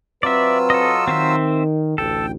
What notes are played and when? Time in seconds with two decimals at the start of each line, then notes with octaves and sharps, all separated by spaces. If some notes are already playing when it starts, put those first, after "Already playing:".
0.23 F#3 C4 F4 B4 D5 E5 E6
0.70 A4 D#5
1.08 D#3 C4 C5 E5
1.98 A1 D2 A4 G5